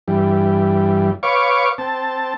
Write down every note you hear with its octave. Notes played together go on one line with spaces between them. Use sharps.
G2 E3 G3
B4 C#5 F5 C#6 D6
C4 A5